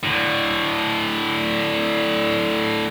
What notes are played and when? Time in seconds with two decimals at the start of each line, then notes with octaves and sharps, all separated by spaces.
0.04 A2 D3